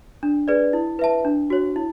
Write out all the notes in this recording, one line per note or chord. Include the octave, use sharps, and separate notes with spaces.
D4
G#4 B4 D5
E4
B4 E5 A5
D4
F#4 C#5
E4